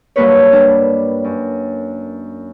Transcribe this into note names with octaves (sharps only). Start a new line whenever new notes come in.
G2 F#3 A#3 B4 C#5
G3 D4
F#2